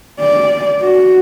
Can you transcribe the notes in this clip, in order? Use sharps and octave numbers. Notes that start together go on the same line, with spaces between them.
D5
F#4